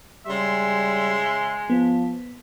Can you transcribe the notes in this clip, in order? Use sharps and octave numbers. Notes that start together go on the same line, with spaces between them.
C#3 G3 G#3 E5 C6
F3 B3